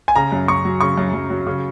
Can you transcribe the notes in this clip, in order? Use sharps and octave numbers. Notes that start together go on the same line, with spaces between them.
G#5
C#3 A#5
F#2
F#2 C#6
F#3
C#3 C#6
F#2
F#2
F#3
C#3